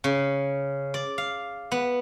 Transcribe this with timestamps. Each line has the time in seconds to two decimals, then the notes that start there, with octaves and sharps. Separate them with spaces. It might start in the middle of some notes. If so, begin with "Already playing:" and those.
0.04 C#3
0.94 D5
1.18 F5
1.72 B3